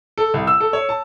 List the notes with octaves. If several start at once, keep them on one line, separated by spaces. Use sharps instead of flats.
A4
C2
E6
A4
C#5
A5